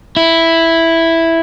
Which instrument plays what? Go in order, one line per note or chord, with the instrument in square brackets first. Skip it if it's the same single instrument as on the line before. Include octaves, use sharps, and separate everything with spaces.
[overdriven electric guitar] E4